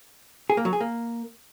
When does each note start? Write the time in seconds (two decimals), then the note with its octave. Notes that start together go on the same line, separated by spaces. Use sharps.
0.50 G#4
0.57 A#3
0.65 F#3
0.73 G#4
0.81 A#3